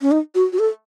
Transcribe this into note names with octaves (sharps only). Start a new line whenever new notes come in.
C#4
D#4
F#4
F#4
A4